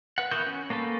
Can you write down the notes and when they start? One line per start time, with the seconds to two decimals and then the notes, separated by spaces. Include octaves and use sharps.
0.18 B4 F#5
0.31 E3 B3 F#4 A#4 G6
0.47 C#4
0.70 A#3 C#4 A4 B4